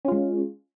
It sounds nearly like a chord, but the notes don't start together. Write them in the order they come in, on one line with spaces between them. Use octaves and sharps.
C#4 F4 G#3